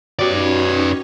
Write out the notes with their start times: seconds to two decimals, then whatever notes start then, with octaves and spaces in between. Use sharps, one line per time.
0.19 F#3 B3 C#4 D#4 G4 B4 C#5 D5